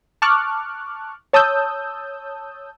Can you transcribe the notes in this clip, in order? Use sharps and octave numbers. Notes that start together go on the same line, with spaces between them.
A5 C#6 D6 F6 F#6
C#5 A5 D#6 E6 G6